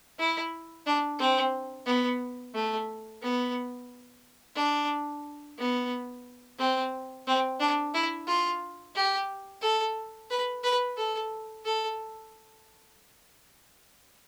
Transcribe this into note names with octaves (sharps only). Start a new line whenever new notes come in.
E4
D4
C4
B3
A3
B3
D4
B3
C4
C4
D4
E4
F4
G4
A4
B4
B4
A4
A4